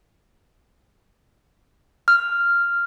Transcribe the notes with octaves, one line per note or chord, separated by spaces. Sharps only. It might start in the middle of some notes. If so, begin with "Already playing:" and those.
F6